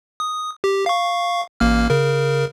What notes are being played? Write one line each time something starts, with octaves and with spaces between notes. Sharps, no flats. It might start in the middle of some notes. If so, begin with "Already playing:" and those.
D#6
G4
F5 C#6
A1 A#3 F6
C#3 A#4